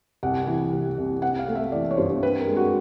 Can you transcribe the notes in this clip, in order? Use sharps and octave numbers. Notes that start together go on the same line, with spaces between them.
C2 F#5
E3
C3
C2
C4 F#5
F5
A3
E5
E3 D5
C#5
G2 C5
C4 B4
A#4
G#3
F#4